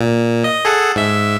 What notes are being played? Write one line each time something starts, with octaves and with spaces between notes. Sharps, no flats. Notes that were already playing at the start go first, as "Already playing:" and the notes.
A#2
D#5
G#4 A4 F#5
G#2 E5